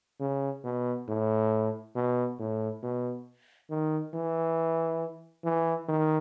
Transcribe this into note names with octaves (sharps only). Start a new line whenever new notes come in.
C#3
B2
A2
B2
A2
B2
D#3
E3
E3
D#3